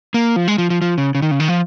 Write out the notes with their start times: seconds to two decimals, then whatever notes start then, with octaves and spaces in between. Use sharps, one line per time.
0.14 A#3
0.36 F3
0.48 G#3
0.58 F3
0.70 F3
0.82 F3
0.98 C#3
1.15 C#3
1.22 D#3
1.31 C#3
1.40 D#3
1.48 F3